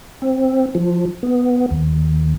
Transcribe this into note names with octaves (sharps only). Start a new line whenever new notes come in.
C4
F3
B3
D#2